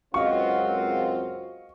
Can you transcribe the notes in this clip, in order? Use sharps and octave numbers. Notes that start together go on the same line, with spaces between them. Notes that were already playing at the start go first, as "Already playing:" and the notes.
C#2 F#2 C4 F4 F#4 D#5 F5 C#6